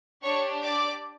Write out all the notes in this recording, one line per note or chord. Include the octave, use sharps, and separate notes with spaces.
D4 G4 C#5 C#6
D5 D6